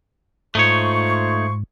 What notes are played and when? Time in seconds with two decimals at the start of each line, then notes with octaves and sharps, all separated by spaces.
0.55 G#2 A3 D#4 F4 C5 C#5 C#6